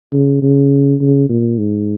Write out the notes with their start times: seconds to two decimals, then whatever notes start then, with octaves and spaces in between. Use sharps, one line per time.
0.13 C#3
0.42 C#3
1.01 C#3
1.30 A#2
1.59 G#2